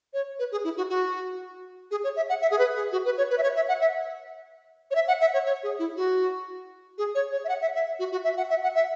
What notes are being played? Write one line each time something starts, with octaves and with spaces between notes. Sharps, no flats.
C#5
B4
G#4
E4
F#4
F#4
G#4
C#5
E5
F#5
E5
G#4
B4
G#4
F#4
B4
C#5
B4
E5
C#5
E5
F#5
E5
C#5
E5
F#5
E5
C#5
C#5
G#4
E4
F#4
G#4
C#5
C#5
E5
F#5
E5
E5
F#4
F#4
E5
F#5
E5
F#5
E5